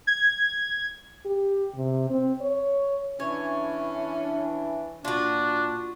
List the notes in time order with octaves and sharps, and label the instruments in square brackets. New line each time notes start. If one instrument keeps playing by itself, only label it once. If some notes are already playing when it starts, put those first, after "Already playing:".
[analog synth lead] G#6
[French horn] G4
C3
C4
C#5
[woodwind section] E3 D4 [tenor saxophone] C#4 [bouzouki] C#5
[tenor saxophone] A#2 [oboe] D4 [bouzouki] F4 F#4